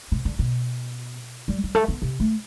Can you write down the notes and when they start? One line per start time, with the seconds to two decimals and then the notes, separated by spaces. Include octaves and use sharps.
0.12 C3
0.25 D3
0.39 B2
1.48 G3
1.64 G3
1.75 A3
1.88 B3
2.02 C3
2.20 A3